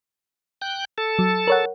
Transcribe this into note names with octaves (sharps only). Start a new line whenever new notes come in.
G5 F#6 G6
A4 A5
F#3
A#4 C#5 F#5